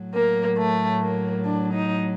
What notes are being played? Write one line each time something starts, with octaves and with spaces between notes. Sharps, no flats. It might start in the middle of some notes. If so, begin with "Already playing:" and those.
Already playing: A2 F#3
A#3
A3
A#3
D4
D#4